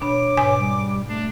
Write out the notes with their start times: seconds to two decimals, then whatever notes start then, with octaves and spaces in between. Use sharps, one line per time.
0.01 B2 D4 C#5 B5 D6
0.37 G#2 B2 G#5
0.59 G3
1.09 A3 D4